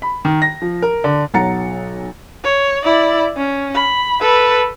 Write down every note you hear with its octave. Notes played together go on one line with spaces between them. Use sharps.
B5
D#3
A#6
F3
A#4
D3
B1 F#3 F#5 A#5 A6 C#7
C#5
E4 D5
C#4
B5
A4 B4